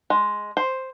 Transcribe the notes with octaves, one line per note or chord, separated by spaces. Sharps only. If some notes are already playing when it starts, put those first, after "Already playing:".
G#3
C5